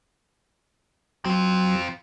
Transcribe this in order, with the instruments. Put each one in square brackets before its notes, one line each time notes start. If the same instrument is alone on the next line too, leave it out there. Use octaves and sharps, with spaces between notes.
[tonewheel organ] F#3 [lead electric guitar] C4 F4